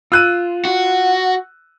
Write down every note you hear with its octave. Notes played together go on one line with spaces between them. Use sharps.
F4 E6 F#6 D#7
F#4